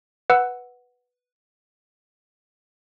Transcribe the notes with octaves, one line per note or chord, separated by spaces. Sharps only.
B4 F#5 E6